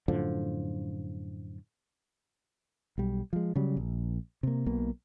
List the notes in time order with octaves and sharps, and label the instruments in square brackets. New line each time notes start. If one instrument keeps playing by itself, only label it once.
[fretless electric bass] F#2 A2 D3 F3
[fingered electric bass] B1 G3
F3 G#3
C#3 F#3 G3
A#1
C3 A#3
B1 B2 A#3